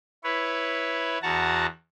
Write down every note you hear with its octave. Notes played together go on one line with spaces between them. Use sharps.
E4 B4 C#5
E2 F#4 F#5 A5 A#5